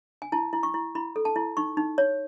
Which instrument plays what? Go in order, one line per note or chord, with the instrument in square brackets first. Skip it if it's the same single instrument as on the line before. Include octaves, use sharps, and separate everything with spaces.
[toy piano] G#5
E4 A5
E4
C#6
E4
E4 B5
A4
A5
E4
D#4 C#6
D#4
C#5